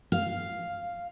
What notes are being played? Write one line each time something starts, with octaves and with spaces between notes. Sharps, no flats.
F5